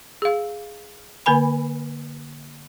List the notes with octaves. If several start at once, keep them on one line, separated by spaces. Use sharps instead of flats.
G#4 F5
D3 A#3 B4 G#5 B5